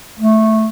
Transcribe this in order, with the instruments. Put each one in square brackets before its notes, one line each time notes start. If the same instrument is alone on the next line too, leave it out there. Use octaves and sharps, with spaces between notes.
[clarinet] A3